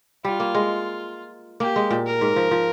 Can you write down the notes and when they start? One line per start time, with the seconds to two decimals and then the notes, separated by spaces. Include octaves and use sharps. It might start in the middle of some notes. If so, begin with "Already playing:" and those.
0.24 G3 F4
0.40 A#3
0.54 G#3
1.60 A#3 G4
1.76 G#3
1.90 A#2
2.06 A#4
2.21 G#2
2.36 F3
2.51 F3